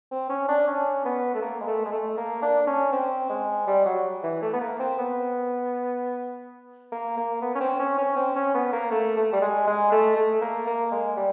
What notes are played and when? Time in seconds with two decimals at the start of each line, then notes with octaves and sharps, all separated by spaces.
0.11 C4
0.30 C#4
0.48 D4
0.67 C#4
1.05 B3
1.34 A3
1.42 A#3
1.61 G#3
1.67 A3
1.85 G#3
1.92 A3
2.17 A#3
2.42 D4
2.67 C#4
2.92 C4
3.29 G#3
3.67 G3
3.85 F#3
4.23 E3
4.42 A3
4.53 B3
4.61 A#3
4.80 C4
4.98 B3
6.92 A#3
7.17 A#3
7.42 B3
7.55 C#4
7.60 C4
7.79 C#4
7.98 C#4
8.16 C4
8.36 C#4
8.54 B3
8.73 A#3
8.91 A3
9.17 A3
9.33 G3
9.42 G#3
9.67 G#3
9.91 A3
10.16 A3
10.41 A#3
10.67 A#3
10.91 G#3
11.16 G3